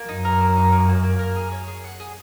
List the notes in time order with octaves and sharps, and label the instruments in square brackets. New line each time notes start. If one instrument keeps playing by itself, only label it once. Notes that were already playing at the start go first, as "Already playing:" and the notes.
Already playing: [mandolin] A#3
[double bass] F#2 [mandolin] D#4
[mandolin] A#4
A#3
D#4
A#3
A#3
A#3
A#4
G#4
C#5
G#4
F#5
G#4